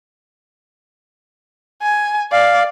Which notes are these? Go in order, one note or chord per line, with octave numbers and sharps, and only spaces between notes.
G#5
D5 F5